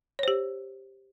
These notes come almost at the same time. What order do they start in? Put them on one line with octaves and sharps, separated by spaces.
C#5 C5 G4